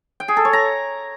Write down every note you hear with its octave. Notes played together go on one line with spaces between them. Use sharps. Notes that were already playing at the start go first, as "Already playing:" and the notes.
G5
G#4
A4
C#5
A#5